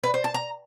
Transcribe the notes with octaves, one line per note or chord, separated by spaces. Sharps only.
B4
C5
A5
A#5